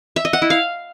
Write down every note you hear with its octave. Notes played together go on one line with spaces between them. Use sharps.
E5
D#5
F#5
E4
F5